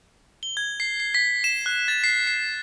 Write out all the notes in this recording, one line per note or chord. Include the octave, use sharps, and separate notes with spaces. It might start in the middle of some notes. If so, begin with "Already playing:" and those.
G7
G#6
C7
C7
B6
E7
F#6
A6
C7
C7